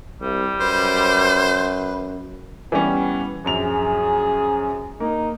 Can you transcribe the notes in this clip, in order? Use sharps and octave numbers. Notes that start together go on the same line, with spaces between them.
C2 G3
F#2 B4 C5
E3 G3 B3 C#4
A#1 F#2 G#4 F7
A#3 D#4